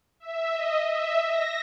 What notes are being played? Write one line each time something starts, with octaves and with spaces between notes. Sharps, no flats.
E5
D#5
E5
A#6